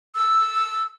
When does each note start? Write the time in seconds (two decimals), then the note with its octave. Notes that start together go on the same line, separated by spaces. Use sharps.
0.16 E6